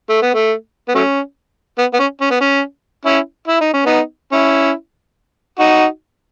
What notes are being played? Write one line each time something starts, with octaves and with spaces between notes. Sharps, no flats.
A3
B3
A3
B3
F#3 A3 C#4
B3
B3
C#4
C#4
B3
C#4
C#4 E4
E4
D#4
C#4
B3 D#4
C#4 E4
D#4 F#4